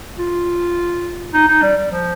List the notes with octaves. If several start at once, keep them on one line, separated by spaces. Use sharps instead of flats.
F4
D#4
D#4
G3
G3
F3